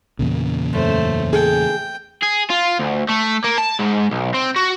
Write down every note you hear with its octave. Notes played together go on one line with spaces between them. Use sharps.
E2 A#2 C#3
F#2 A3 C5
G#4 A4 G5
G#4
F4
D2
A3
A#3
A5
G#2
B1
C4
F#4